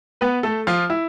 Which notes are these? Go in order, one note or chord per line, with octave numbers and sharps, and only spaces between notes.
B3 B4
A3 A4
F3 F4
E4